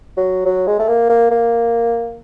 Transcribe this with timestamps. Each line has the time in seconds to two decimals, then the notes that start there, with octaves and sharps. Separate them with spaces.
0.17 F#3
0.46 F#3
0.67 G#3
0.79 A3
0.89 A#3
1.10 A#3
1.31 A#3